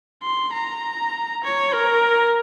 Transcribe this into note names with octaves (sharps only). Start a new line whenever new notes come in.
C6
A#5
C#5
A#4